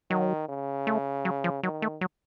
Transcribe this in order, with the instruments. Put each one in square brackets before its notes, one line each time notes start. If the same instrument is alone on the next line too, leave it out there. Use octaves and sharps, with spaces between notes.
[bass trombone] D#3 [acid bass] F#3
[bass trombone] C#3
[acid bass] A3
F#3
F3
[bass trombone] D#3 [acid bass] F#3
[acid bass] A3
F#3